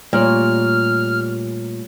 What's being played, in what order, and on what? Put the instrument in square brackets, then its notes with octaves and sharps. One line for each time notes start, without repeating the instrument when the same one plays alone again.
[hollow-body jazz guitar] A#2 [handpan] G3 A3 C#5 [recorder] F6